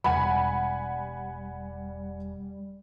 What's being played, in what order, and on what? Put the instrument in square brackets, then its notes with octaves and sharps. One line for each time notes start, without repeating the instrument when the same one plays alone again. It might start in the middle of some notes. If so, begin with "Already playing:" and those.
[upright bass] E1 [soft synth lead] G3 [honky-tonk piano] F#5 G#5 B5